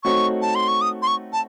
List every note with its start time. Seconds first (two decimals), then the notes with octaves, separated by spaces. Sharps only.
0.03 A3 C4 D#4 F#4 C#5 C#6
0.42 A5
0.55 C6
0.68 C#6
0.81 D#6
1.02 C6
1.07 C#6
1.33 A5